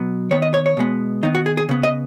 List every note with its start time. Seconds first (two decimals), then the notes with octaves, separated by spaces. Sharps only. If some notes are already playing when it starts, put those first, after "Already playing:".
Already playing: B2 F#3 B3
0.31 D#3 B3 C#5
0.42 D#5
0.54 C#5
0.66 C#5
0.77 B2 G#3 B3
1.23 D#3 B3 D#4
1.35 F#4
1.46 G#4
1.57 G#4
1.69 C#3 B3
1.83 D#5